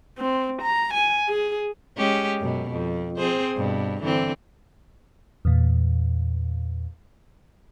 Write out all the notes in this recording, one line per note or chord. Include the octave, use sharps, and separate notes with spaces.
C4
A#5
G#5
G#4
G#3 C#4 G4
F#2 B2
F2
C4 G#4 C5
G2 B2
D3 E3 C4
E2 A#2